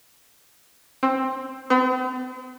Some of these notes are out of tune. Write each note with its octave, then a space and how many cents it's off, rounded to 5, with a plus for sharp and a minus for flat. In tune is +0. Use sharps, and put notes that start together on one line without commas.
C4 +15
C4 -45